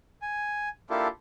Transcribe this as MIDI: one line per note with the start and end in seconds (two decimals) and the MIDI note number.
0.22 0.69 80
0.90 1.08 58
0.90 1.08 62
0.90 1.08 64
0.90 1.08 65
0.90 1.08 67
0.90 1.08 69